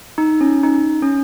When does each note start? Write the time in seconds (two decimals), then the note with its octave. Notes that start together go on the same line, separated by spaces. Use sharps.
0.18 D#4
0.41 C#4
0.64 D#4
1.02 C#4